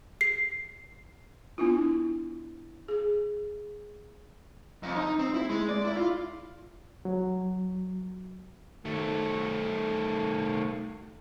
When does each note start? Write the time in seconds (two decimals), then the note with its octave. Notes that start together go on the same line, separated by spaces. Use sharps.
0.21 C7
1.58 B3 D4 E4 F4
2.88 G#4
4.83 F2
4.96 D#4
5.19 C4
5.34 E4
5.50 G#3
5.69 D5
5.85 E4
5.97 F4
7.05 F#3
8.85 D#3 A3